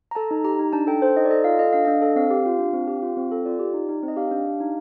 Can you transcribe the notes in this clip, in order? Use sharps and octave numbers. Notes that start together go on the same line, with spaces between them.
A#5
A4 A5
D#4
G4 A#5
D#4
D4 A5
A4 G5
A4 C5
D#4 D#5
D5
A4 D#5
F4 F5
A4 D#5
D4 F5
D4 D#5
A4
C4 F5
G4
F4
D4
C4
G4
F4
C4
A4
F4 D5
G4
D#4
D#4
C4
D#5
G4 F5
D4
G4
D#4